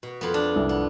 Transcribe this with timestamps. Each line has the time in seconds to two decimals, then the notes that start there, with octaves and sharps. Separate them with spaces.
0.03 B2
0.21 F2 B3
0.34 D4
0.55 C2
0.69 B3